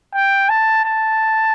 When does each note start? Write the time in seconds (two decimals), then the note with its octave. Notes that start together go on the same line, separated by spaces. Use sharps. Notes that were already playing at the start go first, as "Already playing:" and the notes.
0.14 G5
0.49 A5
0.84 A5